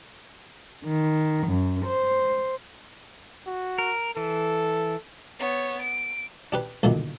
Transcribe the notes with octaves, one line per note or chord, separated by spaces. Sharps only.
D#3
F#2
C5
F#4
A#4
E3 A4
B3 C#5
D7
D4 G4 B4
B1 G2 A#2 D3 D#3